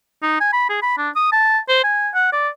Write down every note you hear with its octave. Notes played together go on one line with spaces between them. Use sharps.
D#4
G#5
B5
G#4
B5
D4
D#6
A5
C5
G#5
F#5
D5